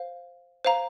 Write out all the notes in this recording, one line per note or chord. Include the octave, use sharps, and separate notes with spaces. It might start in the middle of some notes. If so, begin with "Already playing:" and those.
Already playing: C5 F5
C5 F5 A#5